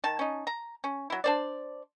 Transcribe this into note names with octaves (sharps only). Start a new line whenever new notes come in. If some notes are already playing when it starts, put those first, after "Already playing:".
D#3 A5
C#4 D#4
A#5
C#4
F#3 E4
D4 C5 D5